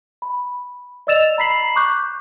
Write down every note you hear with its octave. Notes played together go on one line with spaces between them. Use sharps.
B5
D5 D#5 E6 A6 E7 F7
A#5 B5 B6 C7 F#7
C#6 D6 F#6 G6